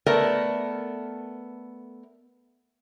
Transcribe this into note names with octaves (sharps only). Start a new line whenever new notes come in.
A3 B3 A#4 D5 A5